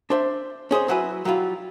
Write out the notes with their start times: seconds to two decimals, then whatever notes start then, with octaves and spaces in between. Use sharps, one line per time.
0.10 D4 C5 E5
0.71 C#4 G#4 C5 D#5
0.88 F#3 E4 F#4 B4 E5 G#5
1.25 F#3 G3 E4 F4